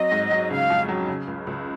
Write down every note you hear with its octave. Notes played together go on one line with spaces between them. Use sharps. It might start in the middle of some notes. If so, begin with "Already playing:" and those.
Already playing: F#3 C4 D#5
G#2
F#3
C#3 F5
F2
F#3
C#3
C#2
C#2